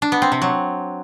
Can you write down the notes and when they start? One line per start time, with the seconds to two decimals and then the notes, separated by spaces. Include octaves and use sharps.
0.02 D4
0.12 B3
0.22 C4
0.32 C3
0.42 F#3